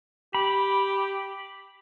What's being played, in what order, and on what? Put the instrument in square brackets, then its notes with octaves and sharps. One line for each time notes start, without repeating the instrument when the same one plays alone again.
[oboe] G4 [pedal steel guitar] B5